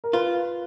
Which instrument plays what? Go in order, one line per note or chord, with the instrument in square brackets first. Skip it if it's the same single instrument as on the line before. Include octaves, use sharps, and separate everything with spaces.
[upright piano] A#4
[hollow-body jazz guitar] F4 [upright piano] B4